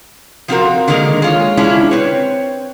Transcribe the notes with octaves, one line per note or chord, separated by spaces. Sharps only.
F3 F#3 C4 F4 F#4 A#4
D3 D#3 G#3 A#3 A#4
G#3 F4 C#5
G#3 C#4 D4 E4 F4
C4 B4 C#5